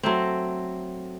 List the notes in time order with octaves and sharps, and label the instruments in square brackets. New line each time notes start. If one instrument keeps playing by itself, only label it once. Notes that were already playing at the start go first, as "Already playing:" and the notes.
[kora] F#3 A3 C4